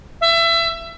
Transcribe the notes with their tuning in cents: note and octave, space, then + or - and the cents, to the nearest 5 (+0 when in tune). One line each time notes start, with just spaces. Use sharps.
E5 +25